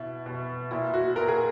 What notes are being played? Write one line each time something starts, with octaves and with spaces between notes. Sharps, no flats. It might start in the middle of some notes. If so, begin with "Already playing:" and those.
Already playing: B2 E4
B2
A#2 E4
F#4
A#2 A#4
G#4